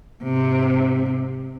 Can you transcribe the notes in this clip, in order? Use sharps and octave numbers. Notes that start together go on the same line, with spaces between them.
G#2 C3